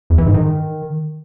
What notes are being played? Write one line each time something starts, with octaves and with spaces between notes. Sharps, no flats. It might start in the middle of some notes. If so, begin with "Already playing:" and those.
E2
E3
G#2
D#3